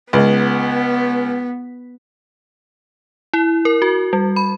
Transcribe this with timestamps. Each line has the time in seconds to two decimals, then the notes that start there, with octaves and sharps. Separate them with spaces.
0.13 C#2 B3
3.34 E4
3.65 A#4
3.82 F#4
4.13 G3
4.36 B5